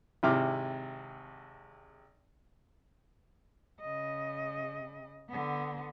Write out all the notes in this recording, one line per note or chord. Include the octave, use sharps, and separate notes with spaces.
G#1 C3 E4 D6 F6
C#3 D#5
D3 B3